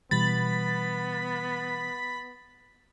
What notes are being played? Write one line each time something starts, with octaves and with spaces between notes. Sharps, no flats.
B2 E3 G3 B3 B5 A6